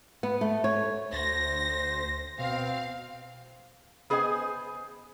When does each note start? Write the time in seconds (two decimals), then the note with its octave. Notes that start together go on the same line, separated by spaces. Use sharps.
0.23 B3
0.41 A3
0.64 C#5
1.12 D2 C5 A#6
2.39 B2 C4 F5
4.10 B3 G#4 C5 D#5 F5 G#5